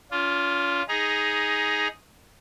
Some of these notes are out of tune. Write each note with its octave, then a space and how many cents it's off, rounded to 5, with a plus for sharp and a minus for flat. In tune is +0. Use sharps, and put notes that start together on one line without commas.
C#4 +45 F4 +0
D#4 +10 G#4 +0 A#5 +20